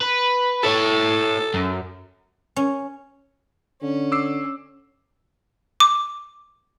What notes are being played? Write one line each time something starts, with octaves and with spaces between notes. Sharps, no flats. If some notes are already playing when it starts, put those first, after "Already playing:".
B4
E4 A4 C#5
F#2
C#4
D3 C#4
D6 E6 C7
D6